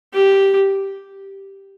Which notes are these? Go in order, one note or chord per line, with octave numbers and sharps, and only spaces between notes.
G4